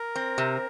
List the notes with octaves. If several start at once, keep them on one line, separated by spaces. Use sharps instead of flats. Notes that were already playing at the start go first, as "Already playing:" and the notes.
Already playing: A#4
C4
C3